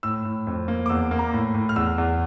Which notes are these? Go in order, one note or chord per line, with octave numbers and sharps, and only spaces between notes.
A2 E6
A2
F2
A#3
D6
E2 E6
A#3
A#5
A2
A2
F6
E2 E6
E2